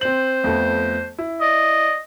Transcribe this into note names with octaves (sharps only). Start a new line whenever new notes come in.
C4 C5 F#7
F2 A3 B3
E4
D5 D#5